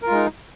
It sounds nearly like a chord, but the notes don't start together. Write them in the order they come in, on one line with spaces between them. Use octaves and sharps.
A#4 F4 G#3 D#4